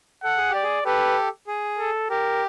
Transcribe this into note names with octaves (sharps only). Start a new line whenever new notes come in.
A4 F#5
G#4
G4 D5
G#4
G4 A4 B4
G#4
A4
G4 A#4